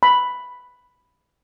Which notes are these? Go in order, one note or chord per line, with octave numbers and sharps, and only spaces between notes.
B5